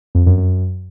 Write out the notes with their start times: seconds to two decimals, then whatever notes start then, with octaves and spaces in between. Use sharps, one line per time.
0.15 F2
0.26 F#2
0.38 F#2